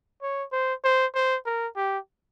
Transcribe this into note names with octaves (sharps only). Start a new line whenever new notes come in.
C#5
C5
C5
C5
A#4
G4